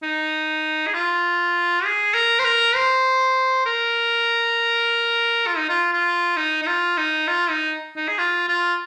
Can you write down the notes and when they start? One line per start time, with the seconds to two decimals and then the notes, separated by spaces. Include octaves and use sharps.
0.03 D#4
0.87 G#4
0.94 F4
1.85 G#4
2.14 A#4
2.39 C5
2.44 A#4
2.75 C5
3.66 A#4
5.47 F4
5.57 D#4
5.69 F4
5.92 F4
6.37 D#4
6.62 D#4
6.67 F4
6.97 D#4
7.27 F4
7.50 D#4
7.96 D#4
8.08 G#4
8.18 F4
8.48 F4